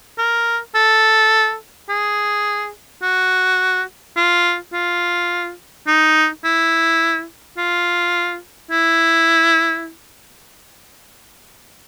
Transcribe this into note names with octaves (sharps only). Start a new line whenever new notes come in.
A#4
A4
G#4
F#4
F4
F4
D#4
E4
F4
E4